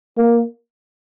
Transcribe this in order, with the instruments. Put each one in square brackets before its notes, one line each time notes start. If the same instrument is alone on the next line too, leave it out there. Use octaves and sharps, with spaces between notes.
[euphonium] A#3